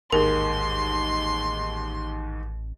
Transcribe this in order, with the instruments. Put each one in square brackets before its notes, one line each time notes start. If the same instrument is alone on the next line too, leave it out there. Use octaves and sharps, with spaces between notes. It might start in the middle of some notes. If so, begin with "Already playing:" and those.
[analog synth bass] A1 [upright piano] D#2 G#2 G#3 [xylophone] A#4 [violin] C6